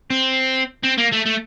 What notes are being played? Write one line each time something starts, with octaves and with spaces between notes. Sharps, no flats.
C4
C4
A#3
A3
A3